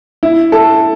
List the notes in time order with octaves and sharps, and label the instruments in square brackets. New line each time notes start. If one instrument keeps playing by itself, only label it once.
[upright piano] E4
A4